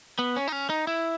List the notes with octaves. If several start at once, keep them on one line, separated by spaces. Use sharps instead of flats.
B3
C#4
D#4
C#4
D#4
E4